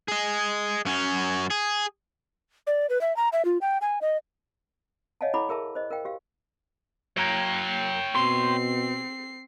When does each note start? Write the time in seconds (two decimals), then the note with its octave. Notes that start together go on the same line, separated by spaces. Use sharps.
0.08 G#4 D#5
0.86 F#2 C#4
1.50 G#4
2.67 D5
2.90 B4
3.01 E5
3.17 A#5
3.33 E5
3.45 F4
3.61 G5
3.81 G#5
4.01 D#5
5.21 C#5 D#5 F5 F#5 G#5 A5
5.34 E4 A4 F#5 B5 D6
5.49 G#4 A#4 E5 A5
5.75 C5 D#5
5.91 A#4 F5 G5
6.05 F#4 G4 F5
7.17 F#3 A#3 A#4 C#5 G5
8.15 B2 C4 C6 C7